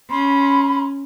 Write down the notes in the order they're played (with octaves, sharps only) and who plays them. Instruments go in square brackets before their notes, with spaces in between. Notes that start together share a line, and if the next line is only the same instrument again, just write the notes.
[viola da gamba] C#4 [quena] B5 [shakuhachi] C6